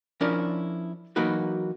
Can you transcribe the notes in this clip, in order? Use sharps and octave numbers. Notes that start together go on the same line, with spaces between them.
F3 C#4 D4 E4 A#4 D5
E3 F#3 A#3 D#4 F#4 B4